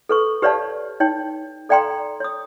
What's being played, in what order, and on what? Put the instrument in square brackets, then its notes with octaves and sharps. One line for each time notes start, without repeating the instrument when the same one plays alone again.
[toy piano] A4 B4 C#6
G4 B4 C#5 D5 F5 A5
D#4 C#5 G5
A4 D5 F5 G5 A#5 C6
C#5 D#6